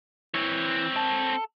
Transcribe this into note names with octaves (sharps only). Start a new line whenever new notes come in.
E3 C4 C#5
A4